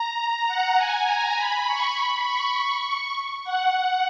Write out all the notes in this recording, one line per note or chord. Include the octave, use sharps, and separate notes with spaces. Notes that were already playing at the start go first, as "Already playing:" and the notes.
Already playing: A#5
F#5
G#5
A#5
B5
C#6
B5
C#6
F#5